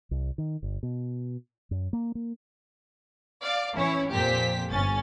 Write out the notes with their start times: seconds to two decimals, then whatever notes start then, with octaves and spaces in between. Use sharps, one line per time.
0.11 C2
0.38 D#3
0.63 G1
0.83 B2
1.71 F#2
1.93 A#3
2.15 A#3
3.42 D5 F5
3.75 E3 C#4 E4 C#5
4.11 F2 A#2 G4 C5 B6
4.68 G1 C#4 A6